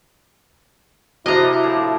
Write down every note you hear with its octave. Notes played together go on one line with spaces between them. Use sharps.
C3 A#3 D4 E4 F#4 C5 D#5 A#5
A2 F3